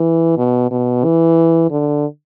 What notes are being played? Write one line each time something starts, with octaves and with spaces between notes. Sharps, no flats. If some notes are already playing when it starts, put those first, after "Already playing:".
Already playing: E3
B2
B2
E3
D3